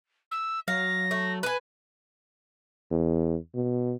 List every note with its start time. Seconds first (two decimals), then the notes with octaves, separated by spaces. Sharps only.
0.31 E6
0.68 F#3 F5 A#6
1.11 A3
1.43 B4 G#5
2.91 E2
3.55 B2